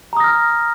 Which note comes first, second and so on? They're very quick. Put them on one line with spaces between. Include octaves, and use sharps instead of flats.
A#5 D#6 A#6 F6